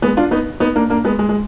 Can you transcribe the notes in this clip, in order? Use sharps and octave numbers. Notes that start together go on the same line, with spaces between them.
G#3 B3
D4 F4
B3 D#4
B3 D#4
A#3 D4
A#3 D4
G#3 B3
G#3
G#3